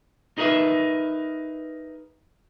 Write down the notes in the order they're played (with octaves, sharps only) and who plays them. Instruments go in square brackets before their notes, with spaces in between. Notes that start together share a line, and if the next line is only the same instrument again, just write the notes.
[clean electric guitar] D#4 G#4 A#4 B4 E5